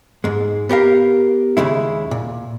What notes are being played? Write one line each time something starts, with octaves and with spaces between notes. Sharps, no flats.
G#2 G#3
B3 G4 A#4 F5
D#2 C#3 G#3 E4
A#2